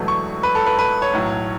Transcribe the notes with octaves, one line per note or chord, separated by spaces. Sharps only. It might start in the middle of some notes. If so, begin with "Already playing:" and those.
Already playing: E1 E2 B2 F#3 A3
C#6
B4
A4
B4
B4
C#5
B1 A2 F#3